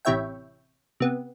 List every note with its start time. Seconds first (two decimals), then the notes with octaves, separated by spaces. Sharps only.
0.05 A1 C3 E4 C#5 E5 G5
1.00 C3 B3